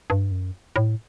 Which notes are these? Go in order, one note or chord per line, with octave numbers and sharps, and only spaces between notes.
G2
F#2
A2